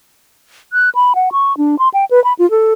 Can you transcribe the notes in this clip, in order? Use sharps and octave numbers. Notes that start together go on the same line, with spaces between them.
F#6
B5
F#5
C#6
D4
C6
G5
B4
B5
F4
A4